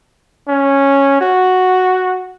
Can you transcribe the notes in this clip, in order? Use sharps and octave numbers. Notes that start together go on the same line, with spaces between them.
C#4
F#4